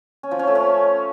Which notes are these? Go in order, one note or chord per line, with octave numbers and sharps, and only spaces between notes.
C#4
F3
C#4
A3
C#4